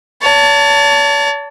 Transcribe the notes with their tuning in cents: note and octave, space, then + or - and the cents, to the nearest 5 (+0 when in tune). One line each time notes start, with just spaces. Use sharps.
C#5 +45 A5 +15